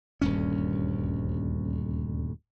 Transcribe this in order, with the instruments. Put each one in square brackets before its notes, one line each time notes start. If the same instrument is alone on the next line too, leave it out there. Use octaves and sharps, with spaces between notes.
[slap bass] D#1 D2 G2 C#4